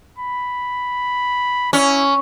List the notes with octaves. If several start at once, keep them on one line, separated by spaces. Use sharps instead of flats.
B5
C#4 E4